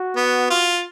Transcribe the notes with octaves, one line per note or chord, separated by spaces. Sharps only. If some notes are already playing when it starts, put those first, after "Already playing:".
Already playing: F#4
B3
F4